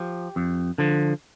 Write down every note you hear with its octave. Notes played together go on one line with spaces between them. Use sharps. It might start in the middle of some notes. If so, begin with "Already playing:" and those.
Already playing: F3 G4
F2
D3 F3